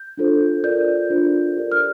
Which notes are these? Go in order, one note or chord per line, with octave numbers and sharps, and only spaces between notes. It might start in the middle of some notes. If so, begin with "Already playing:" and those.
Already playing: G6
D4 F4 A4 C5
F4 A#4 D5 G6
D4 F4 A4 C5
G4 A#4 D5
F6